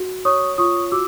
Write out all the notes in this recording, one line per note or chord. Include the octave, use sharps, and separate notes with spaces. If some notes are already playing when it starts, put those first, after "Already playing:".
Already playing: F#4
C#5 C#6 D#6
F4 C#6 D#6
F#4 D6 E6